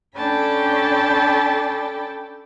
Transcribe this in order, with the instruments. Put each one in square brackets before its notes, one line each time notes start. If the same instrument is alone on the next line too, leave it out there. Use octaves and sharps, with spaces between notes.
[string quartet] C#4 D4 A4 G5 A5 B5